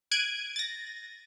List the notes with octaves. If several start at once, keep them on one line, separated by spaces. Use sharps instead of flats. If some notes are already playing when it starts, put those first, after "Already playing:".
F#6 G#6 D7 D#7
A6 A#6